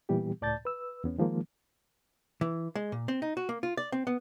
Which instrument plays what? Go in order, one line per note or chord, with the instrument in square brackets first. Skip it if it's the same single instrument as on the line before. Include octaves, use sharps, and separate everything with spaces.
[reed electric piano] A#2 E3 G3 B3 G4
C#2 A2 D5 A5 G6 A6
B4 E6
E2 B3 C#4
D#3 F3 G#3 A#3
[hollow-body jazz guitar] E3
G#3
A#2
C4
D#4
F#4
A#3
F4
D5
C4
B3